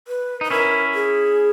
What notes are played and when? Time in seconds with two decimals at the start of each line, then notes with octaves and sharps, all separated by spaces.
0.08 B4
0.41 D#4 B4
0.51 C#4 E4 A#4
0.94 G#4